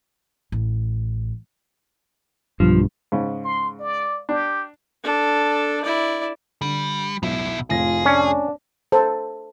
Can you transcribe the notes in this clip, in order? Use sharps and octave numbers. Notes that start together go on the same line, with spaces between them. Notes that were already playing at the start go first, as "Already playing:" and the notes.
A1
B1 G2 F3
G#2 C#3
C6
D5
D4 G4
D4 A4
E4 D5
D3 G3
B1 B2 E5
F1 A2 F4 G#4 A#6
C#4 D4
A4 C5